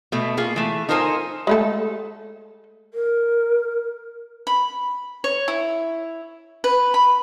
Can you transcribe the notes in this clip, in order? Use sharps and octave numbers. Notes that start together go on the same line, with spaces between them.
B2 A3
A#3 F4 G#4
E3 A3
D#4 F4 A4 A#4 C5 G#5
G#3 A3 A4
A#4
B5
C#5
E4
B4
B5